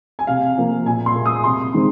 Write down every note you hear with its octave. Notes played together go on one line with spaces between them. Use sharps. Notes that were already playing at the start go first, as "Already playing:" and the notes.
G#5
C3 F5
F3 A#3
A#2 G#5
C6
A#3
D#6
C3 C6
D#3 G#3 C4